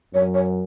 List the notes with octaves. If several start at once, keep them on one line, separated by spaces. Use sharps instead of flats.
F#2 C#5
C#5